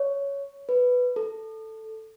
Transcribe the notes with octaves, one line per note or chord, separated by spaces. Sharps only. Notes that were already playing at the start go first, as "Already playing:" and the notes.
Already playing: C#5
B4
A4